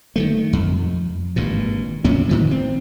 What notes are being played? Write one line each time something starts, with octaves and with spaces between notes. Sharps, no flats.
D#3 F3 A3
F2
G#1 G2 A#2
F2 A#2 C#4
A2 D#3 F3
C4